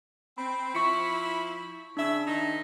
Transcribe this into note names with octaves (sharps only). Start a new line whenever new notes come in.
C4 B5
F3 E4 C#6 C#7
C#3 D4 E5
D#3 D#4